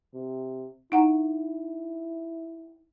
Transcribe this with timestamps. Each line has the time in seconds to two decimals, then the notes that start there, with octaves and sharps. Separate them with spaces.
0.14 C3
0.92 D#4 E4 F#5 A#5